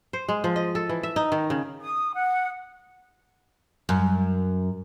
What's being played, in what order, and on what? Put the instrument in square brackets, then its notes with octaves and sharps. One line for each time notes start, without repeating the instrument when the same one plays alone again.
[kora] C5
G#3
F3
D#5
A4
E3
E5
D#4
D#3
C#3
[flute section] D#6
F#5
[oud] F#2